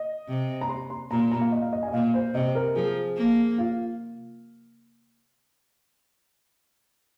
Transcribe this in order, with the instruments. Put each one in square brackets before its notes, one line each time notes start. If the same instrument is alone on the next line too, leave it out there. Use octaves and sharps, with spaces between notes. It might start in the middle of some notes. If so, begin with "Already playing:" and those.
Already playing: [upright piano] D#5
[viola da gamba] C3
[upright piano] A#5
C6
C6
[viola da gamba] A#2 [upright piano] A#5
[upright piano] C6
A#5
F5
D#5
F5
D#5
G#5
D#5
[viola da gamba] A#2 [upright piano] F5
[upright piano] C5
[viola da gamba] C3 [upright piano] D#5
[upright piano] A#4
[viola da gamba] F3 [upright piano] G#4
[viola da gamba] A#3
[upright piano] F4